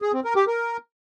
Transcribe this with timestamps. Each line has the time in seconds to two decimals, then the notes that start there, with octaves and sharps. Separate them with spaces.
0.02 G#4
0.13 C4
0.25 A#4
0.36 G4
0.47 A#4